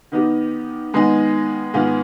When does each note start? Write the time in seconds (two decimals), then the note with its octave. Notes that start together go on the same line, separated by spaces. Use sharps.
0.12 D#3 B3 D#4 G4
0.93 D#3 G#3 B3 D#4 G#4
1.74 G#2 D#3 B3 F4 G#4